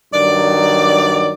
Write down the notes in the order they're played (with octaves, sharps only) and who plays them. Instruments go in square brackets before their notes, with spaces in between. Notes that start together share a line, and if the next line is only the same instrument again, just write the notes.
[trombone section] G2 D#3 F#3 [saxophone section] D5